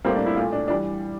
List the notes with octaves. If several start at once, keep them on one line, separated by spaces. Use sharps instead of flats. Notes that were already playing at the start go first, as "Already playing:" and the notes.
A2 G3 A#3 C4
D4
E4
A#2 A3 F4
D4
E3 G3 D4